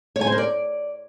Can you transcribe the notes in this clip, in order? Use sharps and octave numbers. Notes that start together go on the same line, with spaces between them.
C#5
G#5
C5
A#4
D5